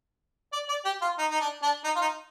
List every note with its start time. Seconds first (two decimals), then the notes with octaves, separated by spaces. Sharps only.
0.53 D5
0.69 D5
0.85 G4
1.02 F4
1.18 D#4
1.31 D#4
1.41 D4
1.63 D4
1.84 D#4
1.96 F4
2.01 D#4